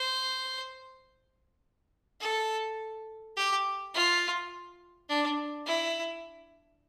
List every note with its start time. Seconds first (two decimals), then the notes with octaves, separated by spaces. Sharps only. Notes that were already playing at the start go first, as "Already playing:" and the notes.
Already playing: C5
2.21 A4
3.37 G4
3.95 F4
5.09 D4
5.67 E4